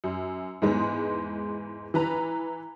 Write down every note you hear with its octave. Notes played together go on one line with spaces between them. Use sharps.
F#2
E2 G#2 G#3 B3
E3 B4 A#5